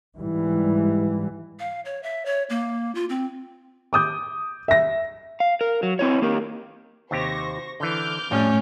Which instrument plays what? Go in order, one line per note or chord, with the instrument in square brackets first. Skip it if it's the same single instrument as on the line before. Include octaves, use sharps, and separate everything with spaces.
[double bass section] G#2 E3 G3
[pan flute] F5
C#5
E5
C#5
A#3
F4
C4
[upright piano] D6 D#6 G6
E5 A#6
[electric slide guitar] F5
A#4
F#3
C4 E4 C#5
A#3 G4 A#4
[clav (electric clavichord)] D#2 C3 G4 [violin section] C5 C#6 A#6
[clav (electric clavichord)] D3 E3 [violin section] D6 F6 G6
[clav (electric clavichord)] F2 G3 [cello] A2 [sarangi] C#4